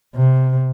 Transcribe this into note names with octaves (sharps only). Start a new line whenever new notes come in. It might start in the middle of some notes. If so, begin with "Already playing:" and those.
C3